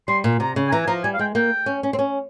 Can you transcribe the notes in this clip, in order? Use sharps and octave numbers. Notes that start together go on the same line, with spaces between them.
G3 C6
A#2
C3 A#5
C#3
G#5
E3 A#5
G#5
F3 A#5
G3 G#5
F5
G#3 G5
A#3 G5
C#4
C#4
C4
C#4